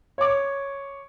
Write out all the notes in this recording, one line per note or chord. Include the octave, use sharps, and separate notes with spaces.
C#5 D6